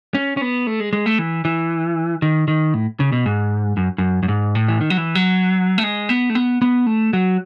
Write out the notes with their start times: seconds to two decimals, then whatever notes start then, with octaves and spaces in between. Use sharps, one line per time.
0.14 C#4
0.37 C#4
0.42 B3
0.67 A3
0.80 G#3
0.93 G#3
1.06 A3
1.19 E3
1.45 E3
2.22 D#3
2.48 D#3
2.74 A2
3.00 C#3
3.12 B2
3.26 G#2
3.77 F#2
3.98 F#2
4.23 F#2
4.28 G#2
4.55 A2
4.68 E3
4.81 D#3
4.90 F#3
4.97 E3
5.15 F#3
5.78 A3
5.83 G#3
6.09 B3
6.30 A3
6.35 B3
6.62 B3
6.86 A3
7.13 F#3